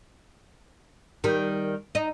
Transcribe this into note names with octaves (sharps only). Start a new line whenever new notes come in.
D#3 G3
D#4